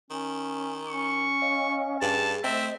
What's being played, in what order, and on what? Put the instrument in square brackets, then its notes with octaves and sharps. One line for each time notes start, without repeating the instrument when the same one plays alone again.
[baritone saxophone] D#3 [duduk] C#4
[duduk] C#4 [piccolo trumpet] C#6
[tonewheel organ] C#5 D#5 F5
[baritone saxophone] G2 [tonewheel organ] G#4 [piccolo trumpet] A5
[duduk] A3 [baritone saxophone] C4 [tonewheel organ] C5 D#5 [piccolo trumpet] E5